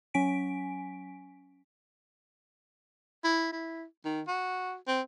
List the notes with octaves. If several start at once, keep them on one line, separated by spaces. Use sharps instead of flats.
F#3 C#4 G#5 B6 D7
E4
E4
D#3
F#4
C4